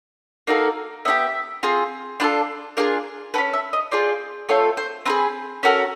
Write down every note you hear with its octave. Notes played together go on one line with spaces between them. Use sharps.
A#3 D#4 F#4 A4 F5
B3 D#4 G4 E5
C4 F4 G#4
D4 F4 A4 B4
D4 F4 G#4 A#4
C#4 F#4 A4 B4
E5
D#5
C4 F4 G#4 D5
A3 C4 F4 A4 C#5
C5
C4 D#4 G#4 B4
C#4 F#4 A4 A#4